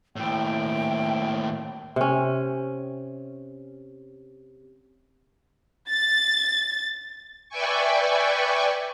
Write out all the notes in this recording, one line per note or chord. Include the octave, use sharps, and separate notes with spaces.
D#2 A2 G5
C3 C#4
A6
B4 D5 E5 G5 G#5 C#6